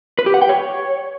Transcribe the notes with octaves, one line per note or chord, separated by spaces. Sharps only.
B4
G4
F#5
G5
C#5